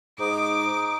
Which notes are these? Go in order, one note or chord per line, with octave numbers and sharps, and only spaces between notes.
G#2 D#4 D6 D#6